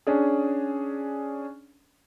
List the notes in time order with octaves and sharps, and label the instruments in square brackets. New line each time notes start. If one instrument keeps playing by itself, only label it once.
[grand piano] C#4 D4 G#4